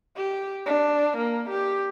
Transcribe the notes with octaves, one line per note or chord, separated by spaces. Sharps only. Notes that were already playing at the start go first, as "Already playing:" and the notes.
G4
D4
A#3
G4